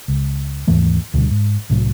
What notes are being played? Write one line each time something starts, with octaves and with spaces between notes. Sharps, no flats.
C#2
D#2 G#2 E3 A3
D2 B2 D3 G3
G#2
C2 A2 F#3